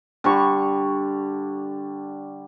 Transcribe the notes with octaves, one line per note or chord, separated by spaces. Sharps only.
D3 G3 C#6